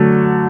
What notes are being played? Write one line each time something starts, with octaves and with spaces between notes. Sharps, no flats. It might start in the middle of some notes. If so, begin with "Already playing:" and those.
Already playing: D3 F#3 A3